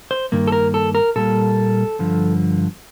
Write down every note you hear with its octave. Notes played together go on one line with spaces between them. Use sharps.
C5
G2 D#3 A#3
A4
A#4
A4
A#4
A#2 G3 A#3 A4
G2 D3 F3